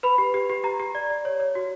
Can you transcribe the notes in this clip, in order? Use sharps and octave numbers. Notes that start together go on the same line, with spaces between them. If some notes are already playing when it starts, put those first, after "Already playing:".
B4 B5
G4
G4
G4
G4 A#5
G4
D5
D5
C#5
C#5
F#4